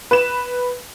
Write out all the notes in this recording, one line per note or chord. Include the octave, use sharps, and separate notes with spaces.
B4 E7